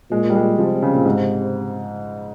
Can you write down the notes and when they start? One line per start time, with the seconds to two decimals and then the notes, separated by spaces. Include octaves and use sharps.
0.11 A#2 G#3
0.30 G3
0.35 G#3
0.58 C3 F3
0.83 C#3
0.94 A#2
1.05 G#2